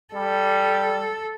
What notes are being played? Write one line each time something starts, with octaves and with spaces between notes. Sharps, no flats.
G3 A4